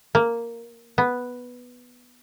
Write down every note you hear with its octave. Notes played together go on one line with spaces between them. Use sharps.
A#3
B3